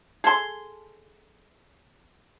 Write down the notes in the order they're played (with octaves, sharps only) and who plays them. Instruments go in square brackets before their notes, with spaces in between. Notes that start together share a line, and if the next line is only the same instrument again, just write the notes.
[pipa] G#4 A4 C6